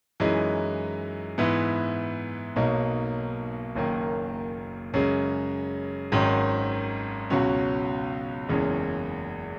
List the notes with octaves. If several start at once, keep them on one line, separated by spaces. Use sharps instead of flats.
F#2 E3 G#3 D#4
G#2 E3 B3 E4
B1 B2 F#3 A#3 D#4
F#1 F#2 D#3 A#3
F#2 C#3 G#3
G#1 G#2 D#3 F#3 C#4
C#2 B2 F#3 C#4 F#4
F#1 E2 C#3 G#3 C#4